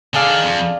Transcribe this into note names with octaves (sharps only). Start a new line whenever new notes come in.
D3 D4 G#4 D5 F5
D#3
F2